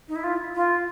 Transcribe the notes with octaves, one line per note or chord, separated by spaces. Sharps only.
D#4
E4
F4
F4